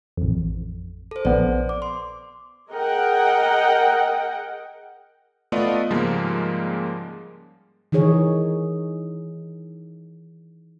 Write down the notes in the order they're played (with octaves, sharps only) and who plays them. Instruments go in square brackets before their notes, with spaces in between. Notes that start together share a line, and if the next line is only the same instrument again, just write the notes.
[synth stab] A1 F2
[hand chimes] A4 C5
[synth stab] A#1 B3 [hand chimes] C5 D5
[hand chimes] D6
C6
[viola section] G#4 A#4 D#5 F#5 G5
[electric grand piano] A3 B3 F4 D5 D#5
G#2 C#3 F3 G3 G#3 A#3
[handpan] D#3 E3 D#4 G#4 C#5